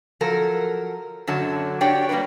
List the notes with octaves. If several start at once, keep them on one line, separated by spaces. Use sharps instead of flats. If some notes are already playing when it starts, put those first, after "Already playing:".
F3 F#3 A4 A#4
F#2 D3 F#3 A5
D4 F#4 G4 C#5 D5 G5
G3 A#3 B3 D4 B4